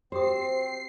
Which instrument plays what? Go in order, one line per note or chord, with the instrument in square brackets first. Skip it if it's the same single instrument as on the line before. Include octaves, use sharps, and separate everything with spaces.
[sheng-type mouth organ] C4 [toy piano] F#4 G4 D#6 [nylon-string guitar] C5 [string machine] C7